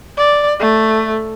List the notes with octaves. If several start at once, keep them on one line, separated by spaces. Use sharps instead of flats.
D5
A3